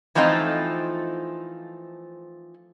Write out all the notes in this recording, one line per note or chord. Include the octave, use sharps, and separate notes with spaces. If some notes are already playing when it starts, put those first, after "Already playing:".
E3 F3 A3 C4 D#4 F4